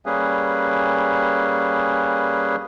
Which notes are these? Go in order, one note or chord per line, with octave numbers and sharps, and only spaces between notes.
G3 A#3 C#4 G#4 B4